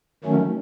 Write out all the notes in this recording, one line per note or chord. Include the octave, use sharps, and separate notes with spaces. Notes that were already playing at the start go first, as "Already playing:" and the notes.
D#3 F#3 A3 C#4